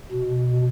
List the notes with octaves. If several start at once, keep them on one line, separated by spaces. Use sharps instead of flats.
B2